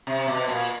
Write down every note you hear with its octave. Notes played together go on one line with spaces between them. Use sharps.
C3
B2
A#2